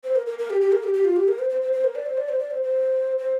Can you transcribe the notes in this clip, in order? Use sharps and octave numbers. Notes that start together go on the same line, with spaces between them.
C5
A#4
A#4
A#4
G4
G4
A#4
G4
G4
F4
G4
A#4
C5
C5
C5
C5
A#4
D5
C5
D5
C5
D5
C5
C5
C5